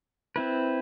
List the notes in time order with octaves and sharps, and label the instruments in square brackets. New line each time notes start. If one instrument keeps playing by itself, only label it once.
[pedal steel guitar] C4 E4 B4